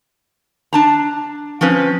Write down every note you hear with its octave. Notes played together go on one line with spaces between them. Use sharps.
D4 A5 A#5
F3 C4 C#4 B4